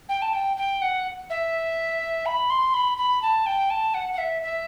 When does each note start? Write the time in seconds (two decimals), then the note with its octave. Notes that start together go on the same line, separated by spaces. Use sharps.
0.09 G5
0.22 A5
0.33 G5
0.57 G5
0.82 F#5
1.30 E5
2.26 B5
2.50 C6
2.74 B5
2.98 B5
3.22 A5
3.46 G5
3.70 A5
3.94 F#5
4.12 F#5
4.18 E5
4.42 E5